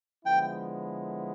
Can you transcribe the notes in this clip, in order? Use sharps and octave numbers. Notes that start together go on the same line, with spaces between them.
D3 F3 G#3 B3 E4 G5